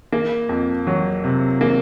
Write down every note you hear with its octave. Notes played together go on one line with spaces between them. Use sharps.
A#3
F2
F#3
C3
A#3